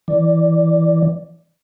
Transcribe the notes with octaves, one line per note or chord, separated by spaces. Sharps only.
E3 D5